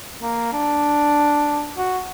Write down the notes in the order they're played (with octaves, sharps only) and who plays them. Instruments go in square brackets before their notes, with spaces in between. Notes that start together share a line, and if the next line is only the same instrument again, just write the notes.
[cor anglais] A#3
D4
F#4